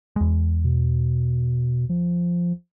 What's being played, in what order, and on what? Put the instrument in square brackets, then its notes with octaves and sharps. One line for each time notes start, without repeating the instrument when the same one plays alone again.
[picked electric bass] E2 G#3
[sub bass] B2
F3